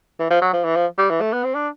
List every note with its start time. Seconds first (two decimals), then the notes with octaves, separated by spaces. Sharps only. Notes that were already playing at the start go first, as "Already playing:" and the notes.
0.19 E3
0.30 F3
0.41 F#3
0.53 F3
0.64 E3
0.76 F3
0.98 G3
1.10 E3
1.21 A3
1.32 B3
1.44 C4
1.55 D4